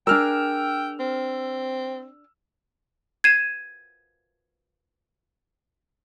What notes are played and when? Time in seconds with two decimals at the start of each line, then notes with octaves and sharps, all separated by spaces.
0.07 D4 G#4 A#4 G5 E6 F6
1.00 C4
3.24 G#6 C7 D#7 E7